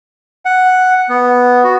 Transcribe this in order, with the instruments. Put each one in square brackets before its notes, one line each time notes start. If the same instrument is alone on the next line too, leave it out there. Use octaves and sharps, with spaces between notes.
[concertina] F#5
B3
F#4